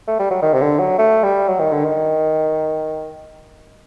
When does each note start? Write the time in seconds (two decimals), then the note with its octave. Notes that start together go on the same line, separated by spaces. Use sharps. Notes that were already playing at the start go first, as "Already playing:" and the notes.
0.08 A3
0.19 G3
0.31 F#3
0.42 D#3
0.53 C3
0.61 D3
0.79 F#3
0.98 A3
1.23 G3
1.48 F#3
1.60 D#3
1.72 D3
1.85 D#3